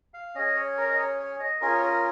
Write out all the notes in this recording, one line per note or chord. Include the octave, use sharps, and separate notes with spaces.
F5
C#4 G#4 D#5
C#5
A#4
D#5
C#5
C#5
D#5
C#4 F4 G#4 A#4
C#5
A#4